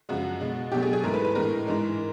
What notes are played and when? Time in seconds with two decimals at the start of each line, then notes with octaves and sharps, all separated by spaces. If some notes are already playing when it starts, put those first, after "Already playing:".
0.09 F#2 C#3 F3 G#3 F#4
0.40 B2 G#3
0.72 B2 F#3 A3 G4
0.83 G#4
0.93 G#4
1.04 G#2 E3 A3 A#4
1.14 B4
1.25 B4
1.35 A2 E3 G#3 A#4
1.67 G#2 E3 G#3